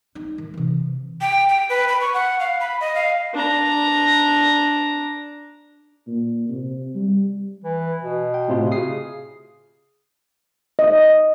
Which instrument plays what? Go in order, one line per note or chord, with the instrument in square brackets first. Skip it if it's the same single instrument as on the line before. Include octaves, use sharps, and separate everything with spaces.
[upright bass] D#4
D#3
C3 E3
[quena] G5
G5
B4
B5
C#6
F#5
F5
B5
D#5
F5
[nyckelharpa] D4 A#5
[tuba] A#2
C3
G3
[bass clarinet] E3
B2
[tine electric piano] G5
A2 C3 F4
[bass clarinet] C#3 [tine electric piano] D#6 C7
[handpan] D#5